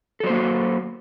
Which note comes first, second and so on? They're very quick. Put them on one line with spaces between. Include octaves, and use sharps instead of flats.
A4 F#3 C5 A#3 F#4